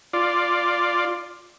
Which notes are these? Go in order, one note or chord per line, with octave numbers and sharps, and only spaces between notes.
F4 D5